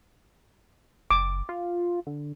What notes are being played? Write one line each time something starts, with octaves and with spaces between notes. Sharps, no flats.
F#1 D6
F4
D3